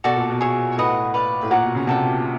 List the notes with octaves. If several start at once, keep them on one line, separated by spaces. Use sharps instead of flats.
B2 F#4 A4 D5
A#2
B2
G#4 C#5 E5
A2 F#4 B4 D#5 F#5
B4 D5 F5
A2
A#2 C#5 F#5 A#5 D6
B2
C#3
C3 F#4 A4 D5 G5